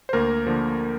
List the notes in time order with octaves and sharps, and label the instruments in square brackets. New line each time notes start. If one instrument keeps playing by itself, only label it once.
[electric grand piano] C5
D2 A#3 A#4
D3 F3 A#3